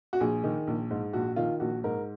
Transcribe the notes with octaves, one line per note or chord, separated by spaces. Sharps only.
F#4
A#1 G#4
D#3
A#1
G#2
A#1 F#4
D#3 F4
A#1 F#4
G#2 A#4